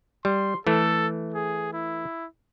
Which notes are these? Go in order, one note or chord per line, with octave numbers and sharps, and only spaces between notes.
G3 C6
E3 A3 A4
G#4
E4